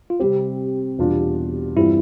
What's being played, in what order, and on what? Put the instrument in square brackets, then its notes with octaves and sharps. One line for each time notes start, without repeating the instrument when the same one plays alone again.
[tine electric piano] F4
[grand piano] C3 G3 C4 [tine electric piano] G4
[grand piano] E2 B2 G3 D4 F4
[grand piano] G2 E3 G3 C4 F4 [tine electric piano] E4